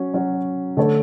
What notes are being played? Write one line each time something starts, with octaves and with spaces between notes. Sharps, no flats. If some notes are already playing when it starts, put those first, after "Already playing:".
Already playing: F#3 C#4 F#4
F#3 C#4 F#4
D3 A3 D4 A4 C#5